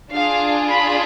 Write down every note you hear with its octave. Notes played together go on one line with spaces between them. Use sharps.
D4 F4 G#4 F5
B5